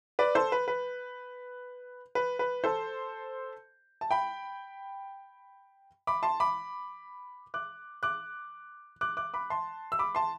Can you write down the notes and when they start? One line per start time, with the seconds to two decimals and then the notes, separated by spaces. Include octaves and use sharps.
0.19 B4 D5
0.35 A4 C5
0.52 B4
0.68 B4
2.15 B4
2.39 B4
2.64 A4 C5
4.01 A5
4.11 G5 B5
6.07 B5 D6
6.23 A5 C6
6.40 B5 D6
7.54 D6 F#6
8.03 D6 F#6
9.01 D6 F#6
9.17 D6 F#6
9.34 B5 D6
9.50 A5 C6
9.92 E6
9.99 B5 D6
10.15 A5 C6